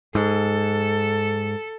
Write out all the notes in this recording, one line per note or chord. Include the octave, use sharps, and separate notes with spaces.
G#2 A4